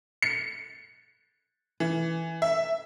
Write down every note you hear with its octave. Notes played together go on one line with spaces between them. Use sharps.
C#7
E3
E5